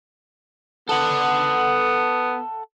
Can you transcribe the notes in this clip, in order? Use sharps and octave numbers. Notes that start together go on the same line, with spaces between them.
B3 A4 F#5